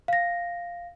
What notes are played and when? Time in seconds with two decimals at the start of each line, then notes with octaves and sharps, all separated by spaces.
0.08 F5 A#6